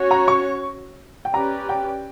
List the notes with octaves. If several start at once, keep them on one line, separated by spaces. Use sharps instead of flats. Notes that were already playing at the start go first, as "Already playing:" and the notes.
Already playing: C#4 F#4 C#5
A#5
C#6
G5
C#4 G4 B4 D5 A#5
G5